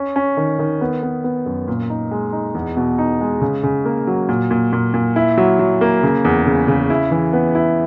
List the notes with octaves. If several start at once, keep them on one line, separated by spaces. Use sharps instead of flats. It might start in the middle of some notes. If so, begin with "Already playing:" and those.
Already playing: C#4
C#4
D#3
D#3
B3
B3
B3
F#2
A#2
D#4
G#3
D#4
E2
B2
D#4
G#3
C#3
C#3
A#3
F#3
A#2
A#2
A#2
A#2
E4
F#3
F#3
A#3
C#3
E2
C#3
C#3
E4
E3
B3
E4